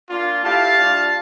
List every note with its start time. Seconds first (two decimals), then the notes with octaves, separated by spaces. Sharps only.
0.10 A#3 D4 F4
0.44 A3 E4 G4 F5 A5
0.78 G3 D4 F4